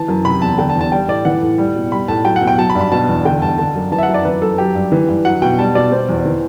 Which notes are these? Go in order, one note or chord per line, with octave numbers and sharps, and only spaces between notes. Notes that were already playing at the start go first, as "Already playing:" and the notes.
Already playing: E3 A5
F#2
C3 B5
E2 A5
D3 G5
A5
E2
A5
G3 G5
A2 D5
E3 F#5
A2
G3
B2
G3 B5
A2 A5
F#3 G5
F#5
B2
G5
F#3 A5
B5
G2
B5
B2 A5
E2
D3 G5
G2 A5
D3 A5
F#2
E3 A5
E5
F#5
F#2
D5
E3 B4
F#2 A4
F#3 G4
G2
E3
G2
F#3 F#5
B2 G5
G3 A5
B2 D5
B2 C5
E2
E3